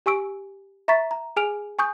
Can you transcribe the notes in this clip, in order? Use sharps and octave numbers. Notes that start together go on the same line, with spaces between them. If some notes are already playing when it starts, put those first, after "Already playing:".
G4 G#5 C#6 E6 D7
E5 A#5 B5 C#6 A6 B6
A#5
G#4 G#5 F6 D7 F7
G#5 C#6 D#6 G6